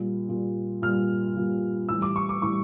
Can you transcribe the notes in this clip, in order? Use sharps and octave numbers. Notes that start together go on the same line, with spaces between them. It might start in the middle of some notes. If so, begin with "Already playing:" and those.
Already playing: A#2 G3
A#2 G3
A#2 G3 F6
A#2 G3
A2 E3 G3 E6
D6
C#6
D6
A2 E3 G3 C#6